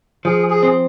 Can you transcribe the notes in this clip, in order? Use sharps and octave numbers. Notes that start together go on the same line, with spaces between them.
F3 G#4
G#4
C4